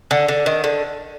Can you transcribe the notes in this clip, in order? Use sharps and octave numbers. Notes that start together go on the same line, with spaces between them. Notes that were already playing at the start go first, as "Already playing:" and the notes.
D3
D3
D#3
D3